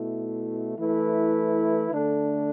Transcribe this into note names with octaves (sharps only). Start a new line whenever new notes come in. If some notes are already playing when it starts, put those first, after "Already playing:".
Already playing: B2 A3 E4
E3 A3 E4 B4
D3 A3 D4 A4